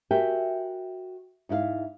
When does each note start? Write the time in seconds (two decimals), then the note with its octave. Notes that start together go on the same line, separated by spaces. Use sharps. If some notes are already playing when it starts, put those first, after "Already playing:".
0.11 F#4 G4 A#4 E5 G5 G#5
1.49 G#2 E4 B4 F5